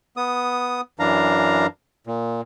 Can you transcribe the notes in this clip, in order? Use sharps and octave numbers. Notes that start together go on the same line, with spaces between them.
B3 D#6
F#2 E3 D4 F5 A#5
A#2